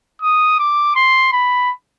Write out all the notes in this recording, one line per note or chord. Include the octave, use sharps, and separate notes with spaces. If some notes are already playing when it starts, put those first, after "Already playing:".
D#6
D6
C6
B5